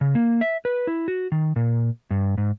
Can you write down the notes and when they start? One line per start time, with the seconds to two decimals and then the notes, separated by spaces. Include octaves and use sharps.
0.01 C#3
0.15 A#3
0.41 E5
0.65 B4
0.87 E4
1.08 F#4
1.32 D#3
1.56 A#2
2.11 G2
2.38 G#2